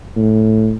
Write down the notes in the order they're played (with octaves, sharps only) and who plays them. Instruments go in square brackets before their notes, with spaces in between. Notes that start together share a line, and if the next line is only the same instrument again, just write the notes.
[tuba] A2